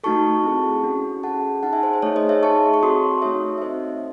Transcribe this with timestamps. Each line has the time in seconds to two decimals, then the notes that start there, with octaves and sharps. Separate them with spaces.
0.04 A3 D#4 F#4 A4 A5 C#6
0.44 C4 E4 G#4
0.83 C#4 F#4 A4
1.23 C#4 G#4 F#5 A5
1.63 D#4 G#4 F#5 A5
1.73 E5 G#5
1.83 C5
1.93 C5
2.02 A3 D#4 G#4 C#5
2.16 C5 D#5
2.29 C#5 E5
2.43 D#4 G#4 A5 C#6
2.74 C#6
2.82 C4 F#4 A4 C6 D#6
3.22 A3 D#4 F#4 A4 C#5 E5
3.58 E5
3.62 C4 D#4 A4 C5 D#5